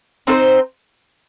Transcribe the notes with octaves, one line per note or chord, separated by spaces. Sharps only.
C4 D#4 A4 C5